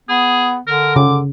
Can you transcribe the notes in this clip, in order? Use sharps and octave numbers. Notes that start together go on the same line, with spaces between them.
B3 G#4
D3 A#4
C#3 D6